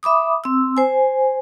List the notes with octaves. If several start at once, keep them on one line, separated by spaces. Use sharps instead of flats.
E5 B5 D6 D#6
C4 E6
C5 G#5